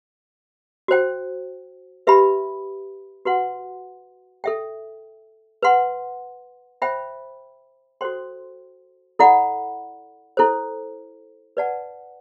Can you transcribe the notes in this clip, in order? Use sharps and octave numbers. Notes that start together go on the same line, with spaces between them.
F#4 C5 G5
G4 B4 E5 B5
F#4 B4 F#5 C6
A4 E5 G5
B4 F#5 C6
C5 E5 G5 B5
F#4 A4 C5 G5 C6
E4 A4 D5 F#5 B5
E4 A4 C5
B4 D5 F#5 A5